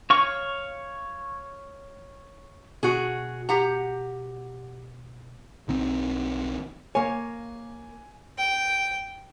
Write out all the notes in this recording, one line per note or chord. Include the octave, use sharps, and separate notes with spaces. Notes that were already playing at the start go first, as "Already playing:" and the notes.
C#5 F5 C#6
B2 F#4 G#4
G4 F#5 A#5
B1 D#3 C4
A#3 C#5 G#5
G5